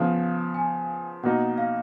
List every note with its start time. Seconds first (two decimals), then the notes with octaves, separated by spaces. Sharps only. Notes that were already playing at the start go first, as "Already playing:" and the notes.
Already playing: C#3 F3 B3 F5
0.55 G#5
1.23 B2 A#3 D#4 F#5
1.58 F5